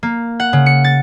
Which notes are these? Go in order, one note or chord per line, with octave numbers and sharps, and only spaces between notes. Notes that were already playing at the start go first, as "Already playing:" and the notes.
A#3
F#5
C#3
C#7
A6